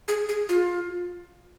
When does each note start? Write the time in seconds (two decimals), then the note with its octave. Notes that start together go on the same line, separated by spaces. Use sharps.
0.08 G#4
0.29 G#4
0.49 F4